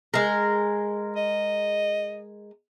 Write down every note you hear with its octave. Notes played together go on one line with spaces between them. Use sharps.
G#3 A#4
D#5